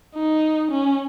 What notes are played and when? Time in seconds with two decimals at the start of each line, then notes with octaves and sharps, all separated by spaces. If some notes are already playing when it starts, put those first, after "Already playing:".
0.15 D#4
0.71 C#4